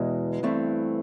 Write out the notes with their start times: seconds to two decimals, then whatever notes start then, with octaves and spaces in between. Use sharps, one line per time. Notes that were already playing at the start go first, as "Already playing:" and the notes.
Already playing: E2 B2 G#3
0.43 G2 E3 A3 C4